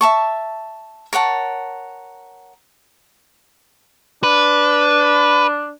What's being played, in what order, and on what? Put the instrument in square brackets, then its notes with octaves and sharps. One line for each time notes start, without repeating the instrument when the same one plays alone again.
[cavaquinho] E5 A5 C#6
A#4 C#5 F#5 A5
[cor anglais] D4 [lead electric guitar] B4